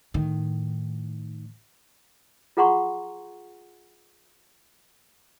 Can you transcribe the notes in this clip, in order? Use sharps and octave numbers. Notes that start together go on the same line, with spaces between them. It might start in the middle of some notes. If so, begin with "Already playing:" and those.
A2 D#3
F4 G#4 F#5 A#5 C6 C#6